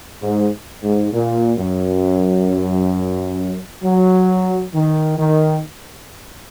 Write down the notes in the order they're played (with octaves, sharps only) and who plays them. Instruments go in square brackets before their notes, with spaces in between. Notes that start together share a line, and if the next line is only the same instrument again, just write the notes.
[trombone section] G#2
G#2
A#2
F#2
F#3
D#3
D#3